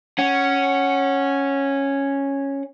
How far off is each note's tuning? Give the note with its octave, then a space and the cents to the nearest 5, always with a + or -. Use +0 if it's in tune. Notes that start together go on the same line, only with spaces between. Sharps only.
C#4 -5 F#5 +5